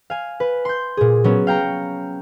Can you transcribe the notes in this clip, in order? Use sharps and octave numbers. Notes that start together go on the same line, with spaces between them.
F5 G#5
B4
C6 G6
A#2 G#4
F#3 B3 C#4
F5 G5 A#5 C#7